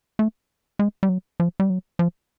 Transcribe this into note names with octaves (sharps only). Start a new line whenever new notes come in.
A3
G#3
G3
F#3
F3
G3
F#3
F3